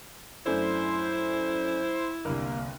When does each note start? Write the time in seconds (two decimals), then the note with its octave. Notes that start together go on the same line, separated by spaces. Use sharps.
0.46 F#2 A3 D4 E4 C5
2.25 G1 C2 A#3